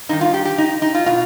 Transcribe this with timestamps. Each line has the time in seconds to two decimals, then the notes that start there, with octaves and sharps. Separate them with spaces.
0.09 G2 D#3 D#4
0.21 F4
0.34 G4
0.45 G4
0.58 D#4
0.82 D#4
0.95 F4
1.06 B2 F4